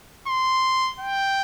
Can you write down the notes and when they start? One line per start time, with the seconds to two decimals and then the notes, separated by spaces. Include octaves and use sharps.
0.28 C6
1.00 G5